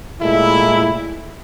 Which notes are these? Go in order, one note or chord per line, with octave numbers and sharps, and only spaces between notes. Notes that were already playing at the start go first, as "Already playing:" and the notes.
A#2 G#3 A3 E4